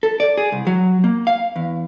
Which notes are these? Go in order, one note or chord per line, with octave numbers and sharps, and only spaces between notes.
A4
D5
G#4
C2
F#3
A#3
F5
E2